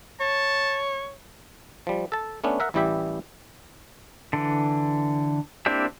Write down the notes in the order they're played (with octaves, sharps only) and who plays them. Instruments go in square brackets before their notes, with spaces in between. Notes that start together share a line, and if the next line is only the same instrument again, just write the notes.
[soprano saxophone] C#5 [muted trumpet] A5
[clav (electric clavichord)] F3 G3
A4 A5
A3 B3 C#4 D4
A#4 E5 F#5
A1 E3 G3 E4 G4 E5
[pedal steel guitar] D3 E3
A#3 C4 D4 E4 G4